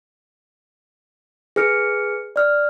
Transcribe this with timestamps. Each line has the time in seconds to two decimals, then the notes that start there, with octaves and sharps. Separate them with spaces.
1.56 G#4 B4 F6 C#7 D7
2.36 D5 F6